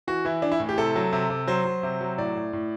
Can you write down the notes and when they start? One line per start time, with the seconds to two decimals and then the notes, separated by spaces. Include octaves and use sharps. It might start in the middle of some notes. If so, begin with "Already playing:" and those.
0.07 E3 F#4
0.25 E3 E4
0.42 E3 D4
0.52 E4
0.60 A2
0.69 G4
0.77 C3 A4
0.96 F#3
1.13 C3
1.30 C3
1.47 F#3 C5
1.65 F#3
1.83 C3
2.01 F#3
2.18 A2 D5
2.35 A2
2.53 A2